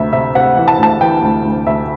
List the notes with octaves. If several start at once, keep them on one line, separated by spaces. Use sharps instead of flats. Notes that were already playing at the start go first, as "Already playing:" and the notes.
Already playing: D2 C3 E5
C3 E5
C3 F#5
E3
A5
D2 A5
E3 G5
D2
D2
D2 E5